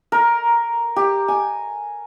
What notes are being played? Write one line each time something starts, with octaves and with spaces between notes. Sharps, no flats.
A#4
G4
G#5